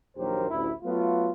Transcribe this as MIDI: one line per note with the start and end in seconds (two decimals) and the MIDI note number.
0.17 0.46 34
0.17 0.46 39
0.17 0.46 54
0.17 0.46 67
0.17 0.46 70
0.17 0.46 72
0.50 0.71 33
0.50 0.71 38
0.50 0.71 64
0.83 1.30 54
0.83 1.30 57
0.83 1.30 59
0.83 1.30 65